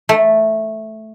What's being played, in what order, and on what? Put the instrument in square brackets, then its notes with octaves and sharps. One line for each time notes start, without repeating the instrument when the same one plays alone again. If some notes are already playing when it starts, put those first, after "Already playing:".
[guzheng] A3